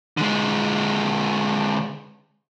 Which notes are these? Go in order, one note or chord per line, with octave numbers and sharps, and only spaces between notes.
D3 G#3